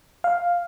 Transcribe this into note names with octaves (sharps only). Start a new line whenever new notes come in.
F5